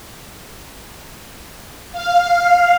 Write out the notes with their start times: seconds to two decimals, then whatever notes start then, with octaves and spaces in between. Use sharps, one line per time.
1.92 F5